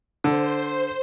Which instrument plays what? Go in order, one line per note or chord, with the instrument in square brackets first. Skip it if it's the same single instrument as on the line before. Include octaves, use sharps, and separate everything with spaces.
[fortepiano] D3 [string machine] C5